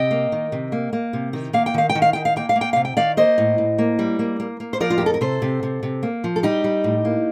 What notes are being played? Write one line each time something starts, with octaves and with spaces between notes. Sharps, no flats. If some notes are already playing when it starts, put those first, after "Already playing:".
Already playing: C3 D#5 G5
A#3
D#3
C3
A#3
A#3
C3
D#3
A#3 F5
G5
D#3 F5
G5
D#3
F5
D#3 G5
F5
A#3 G5
F5
A#3
G5
C3 F5
G5
D#3 D5 F5
A#3 C5 D#5
A2
A2
A#3
G3
A#3
A#3
A#3
C5
F3 A#4 D5
F4
G4
F2
A4
A#4
C3 A4 C5
C3
C3
C3
A#3
F3
A4
G3 D#4 G4
G3
A2
A#3